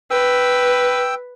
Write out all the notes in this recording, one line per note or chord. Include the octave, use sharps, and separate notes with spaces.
B4 G5 E6